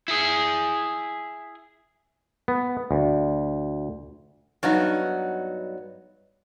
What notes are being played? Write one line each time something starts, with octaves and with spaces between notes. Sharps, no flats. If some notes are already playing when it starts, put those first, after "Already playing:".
E4 G#4
B3
D2
G2 F#3 B3 D#4